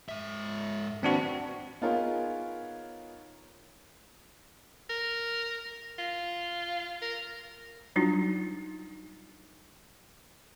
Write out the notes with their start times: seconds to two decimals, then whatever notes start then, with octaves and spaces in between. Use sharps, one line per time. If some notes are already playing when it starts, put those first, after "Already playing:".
0.09 G#2 E5
1.03 D#2 C4 D4 F#4 B4
1.82 B3 D#4 F4 G#4 A#4 C#5
4.89 A#4
5.98 F4
7.02 A#4
7.96 F#3 G3 D4 D#4 F4 F#4